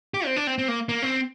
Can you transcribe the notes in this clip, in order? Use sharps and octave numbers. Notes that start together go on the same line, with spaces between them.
G4
C4
D4
C4
C4
A#3
A#3
C4